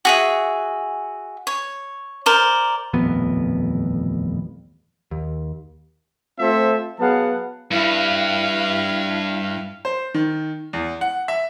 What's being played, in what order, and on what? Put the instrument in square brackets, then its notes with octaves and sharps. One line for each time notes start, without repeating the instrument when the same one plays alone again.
[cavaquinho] F#4 G#4 E5
C#5
A#4 C5 D5
[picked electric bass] D#1 A1 F2 B3
D#2
[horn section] A3 C4 F4 A4 C5 E5
F#3 B3 G#4 F5 F#5 A5
[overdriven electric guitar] G2 [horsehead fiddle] E4 F5
[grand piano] C5
D#3
E2
F#5
E5